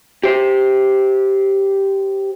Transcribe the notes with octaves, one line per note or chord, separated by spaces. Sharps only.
G4 C5